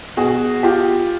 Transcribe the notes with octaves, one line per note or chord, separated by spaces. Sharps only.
B2 F#4 G#4
F4 G4